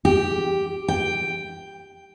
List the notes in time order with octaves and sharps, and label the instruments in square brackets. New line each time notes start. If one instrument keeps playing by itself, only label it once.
[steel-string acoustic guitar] G4
G5